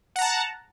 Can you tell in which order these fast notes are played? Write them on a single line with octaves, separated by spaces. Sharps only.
F#5 A#5 A5